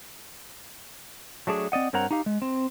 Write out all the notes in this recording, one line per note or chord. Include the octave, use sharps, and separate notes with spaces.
F#3 A3 D4 G#4
C4 D5 D#5 F#5
G2 C4 A#4 C#5 F#5 A#5
D#4 G4 F5
G#3
C4